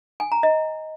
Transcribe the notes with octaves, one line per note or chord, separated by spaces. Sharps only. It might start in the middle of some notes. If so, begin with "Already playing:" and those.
G#5
A#5
D#5